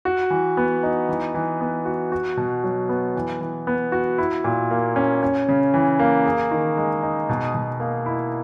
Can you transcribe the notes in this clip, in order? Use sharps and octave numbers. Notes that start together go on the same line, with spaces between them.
F#4
E3
B3
D#4
E3
E3
B3
F#4
F#4
B2
F#3
B3
E3
E3
B3
F#4
E4
A#2
A#3
C#4
C#4
C#3
E3
A#3
G#4
D#3
G#3
D#4
B2
B2
A#3
E4